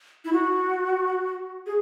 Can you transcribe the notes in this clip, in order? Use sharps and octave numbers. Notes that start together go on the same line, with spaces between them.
E4
F#4
G#4